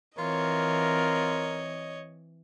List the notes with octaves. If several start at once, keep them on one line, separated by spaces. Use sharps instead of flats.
E3 C4 F4 A#4 C#5 D#5